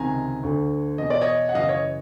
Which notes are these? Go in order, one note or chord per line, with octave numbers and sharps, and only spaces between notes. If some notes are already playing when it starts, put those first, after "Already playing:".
Already playing: C#2 C3 D#3 G#5 A#5
D2 D3
E2 B2 D#5
D5
C#5 D#5
F#5
F#2 C#3 E3 D#5 F5
C#5 D#5